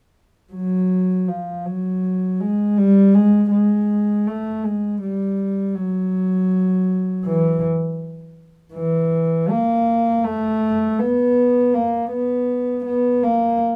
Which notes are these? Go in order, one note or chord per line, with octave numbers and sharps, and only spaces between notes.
F#3
F3
F#3
G#3
G3
G#3
G#3
A3
G#3
G3
F#3
E3
E3
A#3
A3
B3
A#3
B3
B3
A#3